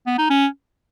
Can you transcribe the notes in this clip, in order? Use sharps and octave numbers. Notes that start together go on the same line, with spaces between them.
B3
D#4
C#4